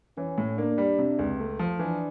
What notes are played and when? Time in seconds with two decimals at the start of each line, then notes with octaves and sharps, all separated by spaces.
0.17 E3 C#4
0.38 A2
0.58 A#3 D4
0.78 G3
0.99 C3
1.19 C#2
1.39 A3
1.59 F3
1.79 E3 D4